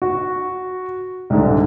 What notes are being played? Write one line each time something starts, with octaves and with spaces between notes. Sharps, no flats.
F#4
C2 G#2 D3